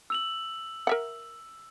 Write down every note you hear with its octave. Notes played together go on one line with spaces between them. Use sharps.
E6 F7 F#7
A#4 E5 F#5